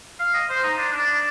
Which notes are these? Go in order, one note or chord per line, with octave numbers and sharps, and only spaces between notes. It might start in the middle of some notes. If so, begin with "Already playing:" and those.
F5
D#5
C5
D#4
D4
D4